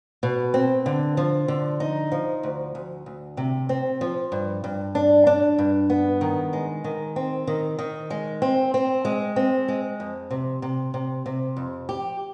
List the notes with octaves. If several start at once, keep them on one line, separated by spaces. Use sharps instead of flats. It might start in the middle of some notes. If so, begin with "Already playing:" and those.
B2
C4
D3
F3
D3
D#4
F3
D2
D2
D2
C3
C4
F3
G2
G2
D4
D4
G2
B3
D#3
G#3
D#3
C4
D#3
D#3
G#3
C4
C4
G#3
C4
G#3
F2
C3
C3
C3
C3
F2
G4